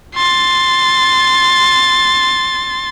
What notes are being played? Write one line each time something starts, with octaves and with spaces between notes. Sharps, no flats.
C6 A6